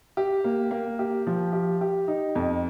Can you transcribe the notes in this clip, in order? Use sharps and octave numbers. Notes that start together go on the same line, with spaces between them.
G4
A#3
A#3
G4
F3
G4
G4
D#4
F2